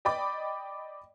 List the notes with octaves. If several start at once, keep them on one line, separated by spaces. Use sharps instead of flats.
D5 D#5 G5 B5 D6